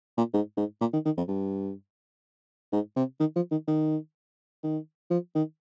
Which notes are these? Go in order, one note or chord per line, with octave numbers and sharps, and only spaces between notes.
A#2
G#2
G#2
A#2
D#3
D#3
F2
G2
G#2
C3
D#3
F3
D#3
D#3
D#3
F3
D#3